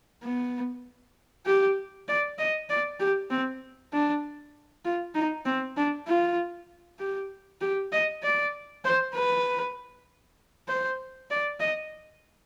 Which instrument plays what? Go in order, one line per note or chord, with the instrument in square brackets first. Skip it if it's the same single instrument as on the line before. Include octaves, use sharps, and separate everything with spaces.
[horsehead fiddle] B3
G4
D5
D#5
D5
G4
C4
D4
F4
D#4
C4
D4
F4
G4
G4
D#5
D5
C5
B4
C5
D5
D#5